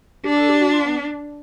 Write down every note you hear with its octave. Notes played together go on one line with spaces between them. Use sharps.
D4 G4
A4
G4
F#4
F4
B3